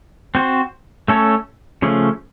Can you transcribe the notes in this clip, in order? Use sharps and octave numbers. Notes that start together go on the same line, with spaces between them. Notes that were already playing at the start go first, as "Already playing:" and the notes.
C4 F#4 C5
A3 C#4 A4 C#5
C#3 F3 A3 C#4